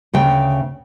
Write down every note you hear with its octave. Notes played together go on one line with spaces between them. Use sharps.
D2 C#3 G5